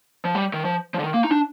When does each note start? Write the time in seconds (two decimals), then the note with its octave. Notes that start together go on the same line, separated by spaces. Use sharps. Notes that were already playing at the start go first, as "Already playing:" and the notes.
0.25 F3
0.35 G3
0.54 D#3
0.65 F3
0.94 F3
0.99 D3
1.04 D#3
1.14 A#3
1.24 D#4
1.31 D4